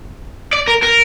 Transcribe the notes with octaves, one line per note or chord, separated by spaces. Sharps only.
D5
A#4
A#4